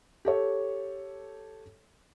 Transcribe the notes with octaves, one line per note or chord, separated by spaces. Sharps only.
G4 A4 C#5